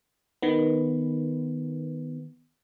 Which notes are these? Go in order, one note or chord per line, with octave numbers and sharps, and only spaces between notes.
D#3 B3